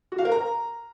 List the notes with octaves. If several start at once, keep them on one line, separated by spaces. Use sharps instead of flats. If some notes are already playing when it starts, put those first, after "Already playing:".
F#4
F5
A#4
A#5